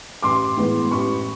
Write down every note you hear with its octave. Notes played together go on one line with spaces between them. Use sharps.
A1 C6 D6
A2 E3 G#3 B3
A1 B5 C#6